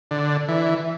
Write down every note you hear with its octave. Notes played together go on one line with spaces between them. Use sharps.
D3
E3